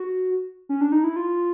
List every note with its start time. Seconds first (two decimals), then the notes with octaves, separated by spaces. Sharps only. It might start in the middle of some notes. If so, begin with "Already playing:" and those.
Already playing: F#4
0.69 C#4
0.81 D4
0.92 D#4
1.04 E4
1.16 F4